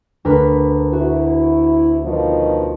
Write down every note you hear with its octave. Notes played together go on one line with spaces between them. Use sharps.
D2 A#4 B4
E4 F#4
B2 D#3 F3